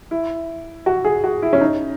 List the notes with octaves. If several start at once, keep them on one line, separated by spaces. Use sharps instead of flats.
E4
F#4
G#4
F#4
E4
C#4
D#4